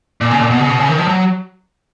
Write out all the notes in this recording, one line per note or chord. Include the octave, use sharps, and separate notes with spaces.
A#2
C#3
A#2
B2
C#3
B2
C#3
D#3
F3
F#3